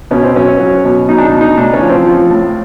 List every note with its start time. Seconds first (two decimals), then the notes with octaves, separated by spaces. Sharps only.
0.11 B2 C#4
0.24 C4
0.36 F#3 C#4
0.60 F#3
0.85 B2
1.08 B2 D#4
1.18 D4
1.24 D#4
1.33 B2
1.41 D#4
1.57 A2 D4
1.73 C#4
1.81 F3
1.89 C4
2.06 F3
2.30 A2